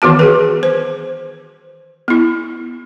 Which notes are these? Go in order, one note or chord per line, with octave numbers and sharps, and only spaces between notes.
D#3 E3 B3 F#4 A5
F#4 G#4 B4
C5
B3 E4